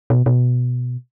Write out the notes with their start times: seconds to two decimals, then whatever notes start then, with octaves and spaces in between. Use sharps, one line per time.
0.10 B2
0.26 B2